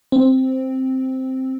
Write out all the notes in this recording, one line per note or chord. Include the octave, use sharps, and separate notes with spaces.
C4